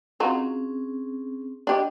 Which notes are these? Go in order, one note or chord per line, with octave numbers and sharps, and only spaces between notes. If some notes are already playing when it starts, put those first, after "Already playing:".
C4 C#4 D#4 F4 F#4 G#4
D4 G4 D#5